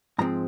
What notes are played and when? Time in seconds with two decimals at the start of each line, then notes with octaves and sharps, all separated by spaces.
0.18 G#2 F3 G#3 C4 A#5